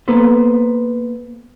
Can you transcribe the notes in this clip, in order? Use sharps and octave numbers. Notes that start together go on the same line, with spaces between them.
A#3 B3 A4 B4 C5